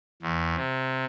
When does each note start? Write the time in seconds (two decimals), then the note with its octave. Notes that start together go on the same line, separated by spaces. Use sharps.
0.22 E2
0.56 C3